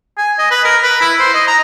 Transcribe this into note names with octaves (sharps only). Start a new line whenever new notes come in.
G#5
D#5
B4
A#4
B4
E4
C5
D#5
A#5